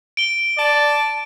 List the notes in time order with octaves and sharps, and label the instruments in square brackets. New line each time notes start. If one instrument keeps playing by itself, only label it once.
[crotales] D7 G7
[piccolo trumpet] D5 [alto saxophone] A5